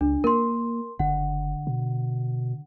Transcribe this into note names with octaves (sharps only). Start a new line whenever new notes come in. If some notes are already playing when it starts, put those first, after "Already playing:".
C#2 D4
A#3 A#4 C6
F#1 D3 F#5
B2